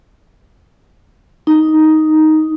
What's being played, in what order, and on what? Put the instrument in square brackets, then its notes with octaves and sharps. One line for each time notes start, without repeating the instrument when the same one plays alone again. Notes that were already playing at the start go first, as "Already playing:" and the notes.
[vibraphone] D#4